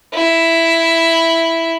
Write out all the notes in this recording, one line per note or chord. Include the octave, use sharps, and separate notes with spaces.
E4